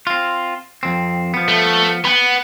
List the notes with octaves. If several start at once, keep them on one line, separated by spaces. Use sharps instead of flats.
C4 F4
F2 C4
F3 B3
A3
B3 F#5 G5 B5